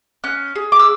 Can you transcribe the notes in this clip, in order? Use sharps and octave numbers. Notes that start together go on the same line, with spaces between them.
C#4 F#6
G#4
D6
E6